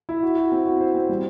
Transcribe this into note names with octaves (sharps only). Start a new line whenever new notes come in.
E4
F#4
F#4
C4
F#4
C5
C4
G3